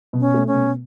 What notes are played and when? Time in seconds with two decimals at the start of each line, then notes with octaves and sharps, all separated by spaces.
0.13 B2
0.20 C#4
0.34 A3
0.47 C#4
0.54 B2